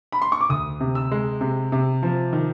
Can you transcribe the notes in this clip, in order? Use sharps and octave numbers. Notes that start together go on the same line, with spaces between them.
B5
C6
C#6
D6
D2 D#6
C3
E6
G#3
C3
C3
F3
D#3